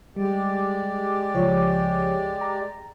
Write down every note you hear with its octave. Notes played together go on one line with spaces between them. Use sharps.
G3 G#3 G4 D5
C#2 F3 C#5
A#5